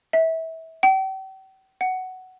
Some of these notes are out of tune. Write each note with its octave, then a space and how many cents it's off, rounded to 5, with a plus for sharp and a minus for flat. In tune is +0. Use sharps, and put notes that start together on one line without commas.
E5 -25
G5 -40
F#5 +10